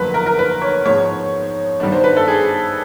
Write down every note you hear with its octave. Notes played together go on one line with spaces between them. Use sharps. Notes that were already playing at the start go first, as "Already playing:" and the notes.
Already playing: G1 F2 D3 F#3 A#3 B4
A#4
A#4
B4
C#5
G#2 F3 G#3 B3 C#5
G2 D#3 G3 B3 D4
C5
B4
A4
G#4